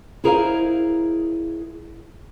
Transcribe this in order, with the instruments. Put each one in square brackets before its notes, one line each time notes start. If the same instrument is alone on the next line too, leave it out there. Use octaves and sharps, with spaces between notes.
[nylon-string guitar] E4 G#4 A#4 C5 D#5 F5